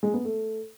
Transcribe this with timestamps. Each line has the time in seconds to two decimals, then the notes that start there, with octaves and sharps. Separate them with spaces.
0.03 G#3
0.14 B3
0.25 A3